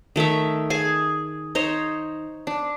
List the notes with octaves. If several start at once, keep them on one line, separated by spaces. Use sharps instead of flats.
D#3 A3 C#5 E5
G#4 G#5 A5
D#4 C5 C#5 D#5
D4